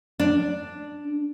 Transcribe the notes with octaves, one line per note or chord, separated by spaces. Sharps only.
D4